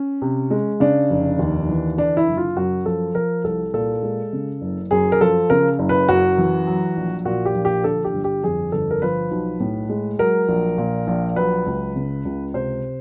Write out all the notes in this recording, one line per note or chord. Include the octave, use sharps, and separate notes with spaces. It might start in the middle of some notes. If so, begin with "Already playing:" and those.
Already playing: C#4
C3
G#3
C#3 D4
F1
D#2
E3
D3 D4
E4
F#1
F4
F#2 F#4
F3 A4
F3 A#4
C2 A4
A#2 A4
G#3
C#3
F#1
F#2 G#4
A#4
F3 A4
C#3 A#4
F#1
B4
F#2 F#4
E3
F#3
A#1
A#2 F#4
G4
A#1
G4
D3 A4
G4
G1
G4
F2 G#4
G1 A4
A#4
F3 B4
B1
A2
G#3
F#3 A#4
A#1
A#2
A#1
F#3 B4
C#2
C#3
C#2
C3 C5